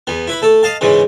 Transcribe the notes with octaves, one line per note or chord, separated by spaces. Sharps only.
E2 B3
E4 B4 B5
A3 A4
D#5 F5 A5
G#2 C#3 E3 G#3